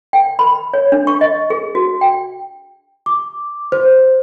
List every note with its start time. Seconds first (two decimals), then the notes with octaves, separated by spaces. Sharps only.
0.13 G5
0.39 B5
0.74 C#5
0.92 D4
1.07 C#6
1.21 D#5
1.50 G#4
1.75 F#4
2.01 G5
3.06 D6
3.72 C5